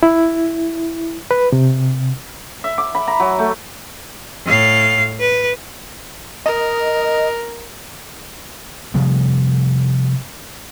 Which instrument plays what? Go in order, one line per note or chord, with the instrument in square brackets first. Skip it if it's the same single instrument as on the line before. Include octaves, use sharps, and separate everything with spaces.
[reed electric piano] E4
B4
C3
[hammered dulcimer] E5
D6
B5
A#5
F#3
A3
[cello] A2 F5
B4
[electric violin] A#4 [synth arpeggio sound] D#5
[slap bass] C3 F3 G3 A3